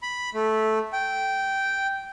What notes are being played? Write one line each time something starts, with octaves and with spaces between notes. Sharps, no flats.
B5
A3
G5